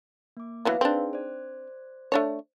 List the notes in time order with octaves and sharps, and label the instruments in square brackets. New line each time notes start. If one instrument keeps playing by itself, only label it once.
[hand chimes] A#3 D6
[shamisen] E3 F#3 B3 [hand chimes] B4 F5
[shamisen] C4 D4 [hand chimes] D#4 G#4
[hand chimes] C5 D5
[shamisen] A3 D4 C#5